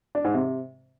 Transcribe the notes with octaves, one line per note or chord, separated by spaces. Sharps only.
D4
G#2
C3